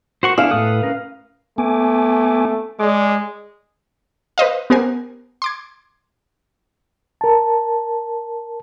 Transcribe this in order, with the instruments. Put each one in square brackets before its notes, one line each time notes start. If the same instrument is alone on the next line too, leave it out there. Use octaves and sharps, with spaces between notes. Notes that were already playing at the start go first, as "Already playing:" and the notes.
[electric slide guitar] F#4 A#4 [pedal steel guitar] C5 F#5 C#6
[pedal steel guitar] B3 D4 E4 [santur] F5 [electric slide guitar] G#5
[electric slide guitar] A2 A4 [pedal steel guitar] B4 D#6 F#6
[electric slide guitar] C#4 A#4 B4
[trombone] A3 [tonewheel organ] B3 G#5 D6
[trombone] G#3 [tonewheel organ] D5 D6
[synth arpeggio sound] B4 C5 D#5 F5
B3 G4 A#4 C5 G#5
C6 D6 G#6
[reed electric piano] A#4 A5